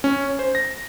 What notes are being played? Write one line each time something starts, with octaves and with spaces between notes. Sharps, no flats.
C#4
C5
A#6